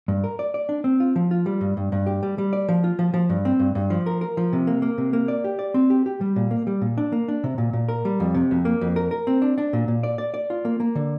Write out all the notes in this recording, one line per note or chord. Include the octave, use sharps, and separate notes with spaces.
G2
A#4
D5
D5
D4
C4
F4
F3
F4
G3
G2
G2
G2
G4
G3
G3
D5
F3
F4
F3
F3
G2
C4
G2
G2
F3
A#4
A#4
F3
C3
A#3
A#3
C3
A#3
D5
G4
D5
C4
G4
G4
G3
A#2
A#3
G3
A#2
D4
A#3
D4
C3
A#2
A#2
A#4
G3
F2
C3
F2
A#3
F2
A#4
A#4
C4
D4
D4
A#2
A#2
D5
D5
D5
F4
A#3
A#3
D3